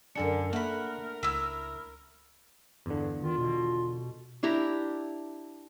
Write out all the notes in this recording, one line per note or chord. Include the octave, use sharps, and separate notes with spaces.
F#2 D3 D4 A4 A#4 G#5 C#7
A3 A#3 A#4 E5 F#5 B5
C#2 E4 E6
E2 G2 D3
D#3 F4
B2
D4 E4 G4 A#5